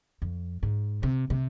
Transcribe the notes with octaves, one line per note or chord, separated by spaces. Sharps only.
F2
G#2
C3
C3